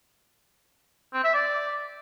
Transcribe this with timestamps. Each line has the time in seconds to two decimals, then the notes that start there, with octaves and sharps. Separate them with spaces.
1.13 C4
1.24 E5
1.34 D5